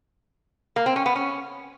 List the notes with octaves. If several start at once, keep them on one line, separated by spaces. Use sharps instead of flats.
A#3
C4
C#4
B3
C#4